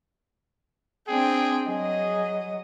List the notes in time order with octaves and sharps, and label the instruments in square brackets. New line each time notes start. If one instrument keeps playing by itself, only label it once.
[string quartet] C4 D4 G5 [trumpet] G#4
[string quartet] F#3 D#5 [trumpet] G#4